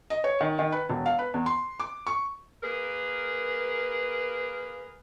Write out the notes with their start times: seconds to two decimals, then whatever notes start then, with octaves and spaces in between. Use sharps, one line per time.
0.10 D#5
0.24 C#5
0.41 D#3
0.59 D#3
0.72 B4
0.89 E1
1.06 F5
1.19 B4
1.34 E2
1.46 C6
1.80 D6
2.07 C#6
2.62 A#3 G#4 A#4 B4